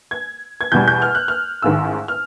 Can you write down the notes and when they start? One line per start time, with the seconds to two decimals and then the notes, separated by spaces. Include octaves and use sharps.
0.11 G#6
0.61 G#6
0.72 E2 B2 G3 G6
0.88 G6
1.02 F6
1.15 F#6
1.28 F6
1.62 A1 G#2 D#3 E6
2.08 F6